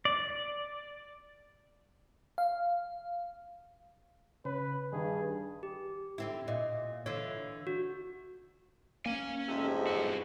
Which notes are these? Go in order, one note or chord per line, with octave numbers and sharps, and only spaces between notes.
D5
F5
C#3 B4
G2 D#3 G#4
G4
D3 C4 E4
A#2 D#5
D3 E3 F4 C#5
F#4
A#3 C#4 G#5
A1 F2 G#2 C3 E5
G2 F#4